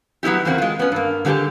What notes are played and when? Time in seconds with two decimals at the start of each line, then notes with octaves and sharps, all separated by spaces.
0.23 F#3 B3 C#4 E4 G4
0.45 E2 C#3 A#3 C4 D#4 F#4
0.58 G#3 F4
0.79 B3 C#4
0.92 G2 A#3
1.25 D3 G3 B3 C#4 G4 G#4